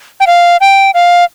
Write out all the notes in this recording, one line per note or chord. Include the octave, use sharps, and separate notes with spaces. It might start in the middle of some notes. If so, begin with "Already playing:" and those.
G5
F5
G5
F5